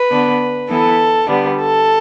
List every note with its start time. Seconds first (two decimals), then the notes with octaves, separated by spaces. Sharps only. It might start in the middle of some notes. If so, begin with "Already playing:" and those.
Already playing: B4
0.11 D3 B3 D4
0.69 E3 B3 E4 A4
1.27 D3 G3 B3 D4
1.57 A4